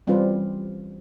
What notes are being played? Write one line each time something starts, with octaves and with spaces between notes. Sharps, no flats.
E3 G3 C4 C#4 F4 B4